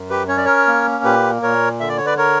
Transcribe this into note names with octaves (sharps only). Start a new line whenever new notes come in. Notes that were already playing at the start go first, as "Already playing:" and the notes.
Already playing: F#2
G4 B4
C#4 C#5
D5
A#4 C#5
A#3
A#2 G4 B4
A#2 A#4 C#5
D3 E5
D5
C#5
B4 D5
A#4 C#5